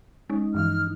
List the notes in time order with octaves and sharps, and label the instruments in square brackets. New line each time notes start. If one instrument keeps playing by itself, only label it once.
[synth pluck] G#3 C#4 [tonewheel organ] D#4
[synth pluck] G2 E3 F3 [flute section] F6